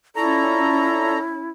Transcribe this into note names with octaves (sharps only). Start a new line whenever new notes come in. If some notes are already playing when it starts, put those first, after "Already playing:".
C#4 E4 F4 A4 D5 A#5 C#6